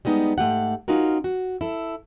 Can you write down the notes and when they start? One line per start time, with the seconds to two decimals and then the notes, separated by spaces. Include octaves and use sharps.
0.05 G3 G#3 B3 D#4
0.38 G#2 A3 G4 F#5
0.88 C#4 D#4 F4 F#4 A#4
1.24 F#4
1.61 E4 A4